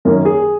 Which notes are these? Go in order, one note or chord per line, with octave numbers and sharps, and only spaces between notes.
F#2 D#3 A#3 C#4 A#4
G#4